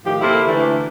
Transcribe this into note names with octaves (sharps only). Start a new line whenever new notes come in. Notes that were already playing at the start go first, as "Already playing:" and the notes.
A2 D#3 F3 G4
C3 A#3 E4 A4 C5
D2 E3 A3 D4